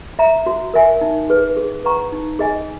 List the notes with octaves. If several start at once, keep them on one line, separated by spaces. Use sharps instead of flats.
E5 A#5
F#4
A#4 E5 G#5
D#4
G#4 B4
G#4
B4 F#5 A#5 C#6
D#4
G#4 D#5 G#5